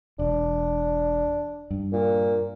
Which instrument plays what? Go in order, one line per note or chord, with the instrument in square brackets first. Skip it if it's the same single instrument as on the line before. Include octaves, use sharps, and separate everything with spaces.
[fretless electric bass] E1 [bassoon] D4
[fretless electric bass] G2
[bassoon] A#2